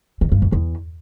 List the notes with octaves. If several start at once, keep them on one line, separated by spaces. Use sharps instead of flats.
D#3
G2
F2
E2